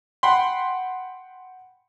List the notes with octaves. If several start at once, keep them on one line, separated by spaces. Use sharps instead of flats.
F#5 G5 B5 C6